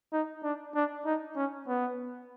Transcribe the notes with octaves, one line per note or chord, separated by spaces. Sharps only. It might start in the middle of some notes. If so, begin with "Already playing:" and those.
D#4
D4
D4
D#4
C#4
B3